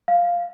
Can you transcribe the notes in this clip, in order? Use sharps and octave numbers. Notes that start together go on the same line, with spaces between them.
F5